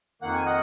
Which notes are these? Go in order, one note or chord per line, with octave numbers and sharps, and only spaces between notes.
F2 D#3 A#3 F#5
G#5
D#5 F#5